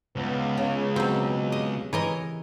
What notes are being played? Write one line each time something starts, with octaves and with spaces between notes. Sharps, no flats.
C#2 B3
C#3
B2 F#3 C4 G4
D#5
E3 A#4 C#5 D#5